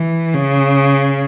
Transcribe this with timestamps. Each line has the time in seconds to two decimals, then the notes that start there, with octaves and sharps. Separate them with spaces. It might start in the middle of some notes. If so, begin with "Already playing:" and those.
Already playing: E3
0.34 C#3